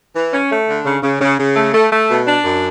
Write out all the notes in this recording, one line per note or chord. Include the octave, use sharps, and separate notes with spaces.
E3
C#4
A3
D3
C#3
C#3
C#3
C#3
A3
A3
A3
B2
D4
F#2